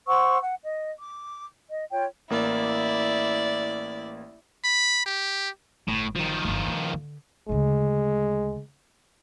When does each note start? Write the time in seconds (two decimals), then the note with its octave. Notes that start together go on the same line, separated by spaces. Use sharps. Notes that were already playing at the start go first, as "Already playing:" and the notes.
0.08 C5 F#5 C#6 E6
0.41 F#5
0.63 D#5
0.98 D6
1.69 D#5
1.92 F4 C#5 G5
2.30 A1 A#3 E4 D5
4.64 B5
5.06 G4
5.88 G1 A2
6.16 D#3 F3
6.44 G1 F#3
6.68 D4
6.93 D3
7.49 D2 C#3 G#3